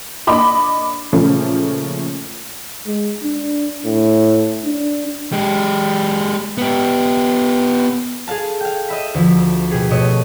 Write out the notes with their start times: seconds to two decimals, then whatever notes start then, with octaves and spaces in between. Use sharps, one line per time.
0.27 A#3 D4 D#5 B5 D6
1.13 A#2 C#3 F3 A3 A#3 C#4
2.86 G#3
3.23 D4
3.85 A2
4.65 D4
5.32 G#3 G4
6.58 B3 G4
8.27 G#4 A4 F5 A5
8.60 F5 G5
8.88 D#5 E5 B5
9.14 D2 F3
9.71 B2 G4 G#4
9.90 B2 A3 A4 C#5 D#5